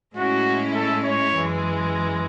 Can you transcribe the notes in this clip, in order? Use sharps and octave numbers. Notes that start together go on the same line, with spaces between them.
A2 G#3 C#4 E4 F#4
A4
C#5
F#2 E3 G#3